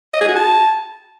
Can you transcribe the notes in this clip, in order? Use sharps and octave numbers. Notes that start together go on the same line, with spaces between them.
D#5
G#4
F#4
A5